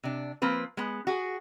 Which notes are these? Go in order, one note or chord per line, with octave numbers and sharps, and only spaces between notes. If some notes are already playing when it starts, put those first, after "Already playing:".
C3 D4
F3 A#3 C4 B4
G#3 B3
F#4 G#4